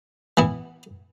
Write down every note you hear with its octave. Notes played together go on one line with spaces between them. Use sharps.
E3 B3 E4